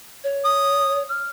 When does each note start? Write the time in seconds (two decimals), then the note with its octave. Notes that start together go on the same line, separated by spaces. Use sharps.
0.24 C#5
0.45 D#6
1.09 F6